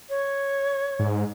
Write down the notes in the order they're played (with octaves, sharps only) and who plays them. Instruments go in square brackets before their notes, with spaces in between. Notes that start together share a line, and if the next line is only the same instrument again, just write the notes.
[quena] C#5
[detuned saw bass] G#2